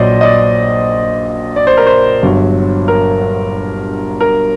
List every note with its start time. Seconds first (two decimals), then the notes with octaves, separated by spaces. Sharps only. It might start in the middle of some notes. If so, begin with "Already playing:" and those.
Already playing: A#1 A#2 F#3 C5 D5 D#5
0.21 D#5
0.24 D5
1.56 D5
1.67 C5
1.77 A#4
1.87 C5
2.23 G1 G2 F#3
2.88 A#4
4.20 A#4